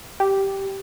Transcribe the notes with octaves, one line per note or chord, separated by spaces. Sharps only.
G4